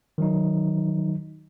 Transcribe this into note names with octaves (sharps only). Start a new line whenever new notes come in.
D#3 F#3 D#4